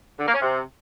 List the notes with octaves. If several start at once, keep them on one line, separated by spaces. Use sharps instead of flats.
D3
A#3
C#4
C3